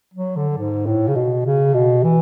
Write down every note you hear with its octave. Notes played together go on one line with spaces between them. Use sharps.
F#3
D3
G#2
A2
C#3
B2
C#3
B2
E3